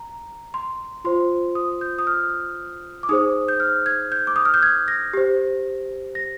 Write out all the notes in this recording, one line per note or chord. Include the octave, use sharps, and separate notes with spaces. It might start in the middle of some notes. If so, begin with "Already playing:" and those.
Already playing: A#5
C6
F4 C5 C6
D#6
G6
D#6
F6
D6
D#4 G#4 C5 D#6
G6
F6
G#6
G6
D6
D#6
F6
G6
G#6
A#6
G4 C5
A#6